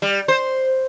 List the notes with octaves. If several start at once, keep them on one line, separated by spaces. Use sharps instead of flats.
G3
C5